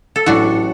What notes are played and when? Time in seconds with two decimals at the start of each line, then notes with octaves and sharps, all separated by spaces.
0.16 A4
0.26 A1 A2 F#3 D4 F#4